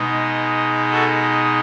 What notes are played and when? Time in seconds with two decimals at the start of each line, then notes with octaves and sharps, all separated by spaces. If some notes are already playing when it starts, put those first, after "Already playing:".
Already playing: B2 G#3 D#4
0.90 F#4 A4